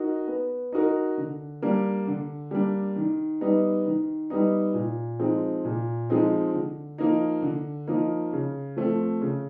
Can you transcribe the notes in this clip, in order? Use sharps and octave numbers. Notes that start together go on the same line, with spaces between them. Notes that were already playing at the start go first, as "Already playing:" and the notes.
Already playing: D#4 F#4 A#4
B3
D#4 F#4 A#4
D3
G3 A#3 D4
D3
G3 A#3 D4
D#3
G3 B3 D#4
D#3
G3 B3 D#4
A#2
F3 G#3 C4 D#4
A#2
F3 G#3 C4 D#4
D3
F3 A#3 D#4
D3
F3 A#3 D#4
C#3
F3 A3 C4
C#3